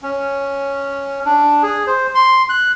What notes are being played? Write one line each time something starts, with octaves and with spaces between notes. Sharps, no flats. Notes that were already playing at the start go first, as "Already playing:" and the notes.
C#4
D4
G#4
C5
C6
F#6